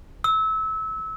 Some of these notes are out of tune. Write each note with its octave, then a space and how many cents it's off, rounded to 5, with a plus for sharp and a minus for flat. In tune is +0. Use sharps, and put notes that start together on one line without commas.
E6 -25